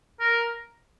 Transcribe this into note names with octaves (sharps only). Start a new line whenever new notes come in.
A#4